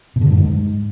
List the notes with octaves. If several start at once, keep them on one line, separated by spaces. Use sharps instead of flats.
B2
D3
G#2
G2
G#2